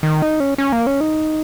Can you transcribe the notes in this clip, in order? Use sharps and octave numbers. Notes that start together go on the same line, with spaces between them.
D#3
D#4
C#4
C#4
A#3
C#4
D#4